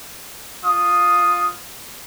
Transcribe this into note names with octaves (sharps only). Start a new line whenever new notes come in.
F4 D#6